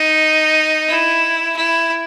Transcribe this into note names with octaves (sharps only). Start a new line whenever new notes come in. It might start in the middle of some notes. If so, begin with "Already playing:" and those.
Already playing: D#4
E4
E4